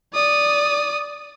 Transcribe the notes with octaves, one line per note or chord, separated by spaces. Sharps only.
D5 D#6